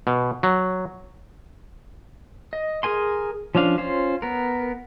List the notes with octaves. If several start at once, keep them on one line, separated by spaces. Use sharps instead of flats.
B2
F#3
D#5
G#4 A#4 G#5 C6
F3 C#4 D4 F5
C#4 F4 C5
B3 A#4